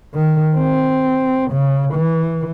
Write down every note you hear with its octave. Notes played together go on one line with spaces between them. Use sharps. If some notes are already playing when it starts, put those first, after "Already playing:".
D#3
C4
C#3
E3